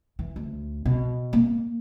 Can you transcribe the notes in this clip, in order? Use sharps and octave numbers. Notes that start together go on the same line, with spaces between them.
E3
D2
B2
A#3